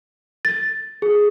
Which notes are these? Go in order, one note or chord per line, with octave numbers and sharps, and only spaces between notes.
A6
G#4